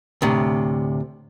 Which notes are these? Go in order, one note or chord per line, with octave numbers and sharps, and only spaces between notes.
D2 A2 C3